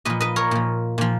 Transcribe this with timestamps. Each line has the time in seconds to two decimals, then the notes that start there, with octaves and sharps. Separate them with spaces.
0.05 A#2 F3 B4 D#5
0.20 B4 D#5
0.36 A#4 C#5
0.51 A#2 F3
0.98 A#2 F3